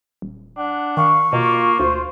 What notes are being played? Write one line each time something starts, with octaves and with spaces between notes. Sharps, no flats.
D#1
D4 F#5
D#3 F5 C#6
B2 A#3 F4
D2 F4 C5